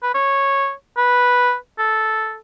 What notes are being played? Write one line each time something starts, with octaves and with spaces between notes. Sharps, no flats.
B4
C#5
B4
A4